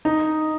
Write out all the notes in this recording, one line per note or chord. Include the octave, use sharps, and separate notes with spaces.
D#4